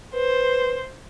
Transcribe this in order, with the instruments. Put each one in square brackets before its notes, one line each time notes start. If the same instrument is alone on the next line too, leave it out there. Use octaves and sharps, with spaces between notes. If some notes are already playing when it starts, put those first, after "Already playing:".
[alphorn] B4 [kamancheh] C5